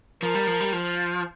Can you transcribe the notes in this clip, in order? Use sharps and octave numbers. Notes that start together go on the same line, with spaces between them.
F3 A#4
G3
F3
G3
F3